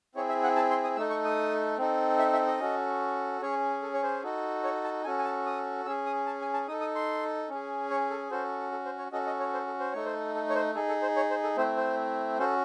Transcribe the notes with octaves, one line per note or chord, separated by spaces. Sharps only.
C4 E4 G#4 C#5
E5
F#5
A5
C6
D#6
A3 D#4 A4 E6
C#6
D#6
C4 D#4 A4
E5
E5
D#5
C#4 F#4 A4
C#4 G#4 C#5
A4
C#5
C5
D#4 F#4 A4
C#5
A5
C#4 F#4 A4 G#5
G#5
A5
D#6
C#4 G#4 E6
D#6
A5
G#5
A5
D#4 A4 D#6
D#6
C6
C#4 G#4
C#5
A4
C#4 F#4 A4 C5
A4
C5
C#5
C#4 F#4 A4 D#5
D#5
C#5
C5
A4
C5
A3 D#4 A4 C#5
C5
A4
C#5
C5
D#4 G#4 A4
A4
C5
C#5
C5
A4
A3 C4 E4 C5
C5
C#4 F#4 A4 C5